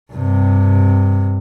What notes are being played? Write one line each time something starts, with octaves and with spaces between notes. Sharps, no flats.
G2 C3